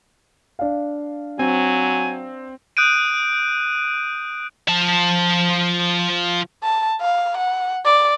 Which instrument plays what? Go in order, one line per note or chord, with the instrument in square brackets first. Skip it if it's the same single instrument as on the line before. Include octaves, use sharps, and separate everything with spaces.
[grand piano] D4 F5
[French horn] F#3 [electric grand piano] C4 [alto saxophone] G#5
[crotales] D#6 F#6 G6 D7 D#7
[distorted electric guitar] F3 A5
[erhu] A5
F5
F#5
D5